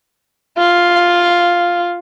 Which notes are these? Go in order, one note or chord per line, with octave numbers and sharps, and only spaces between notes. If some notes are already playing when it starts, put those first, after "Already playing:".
F4